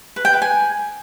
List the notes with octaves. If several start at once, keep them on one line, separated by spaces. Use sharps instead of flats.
B4
G5
B4
G#5